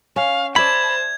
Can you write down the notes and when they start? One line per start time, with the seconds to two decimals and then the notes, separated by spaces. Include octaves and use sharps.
0.16 C#4 F5
0.56 C5 D5 E5 A5 B5 G#6